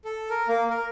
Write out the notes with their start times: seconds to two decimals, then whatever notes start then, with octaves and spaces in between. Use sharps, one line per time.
0.05 A4
0.30 A#4
0.48 A#3
0.70 A#4